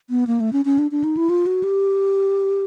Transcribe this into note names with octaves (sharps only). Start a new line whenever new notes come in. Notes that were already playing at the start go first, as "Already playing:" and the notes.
B3
A#3
A3
C#4
C#4
D4
D4
D#4
E4
F4
F#4
G4